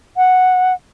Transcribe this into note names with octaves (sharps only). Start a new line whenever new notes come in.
F#5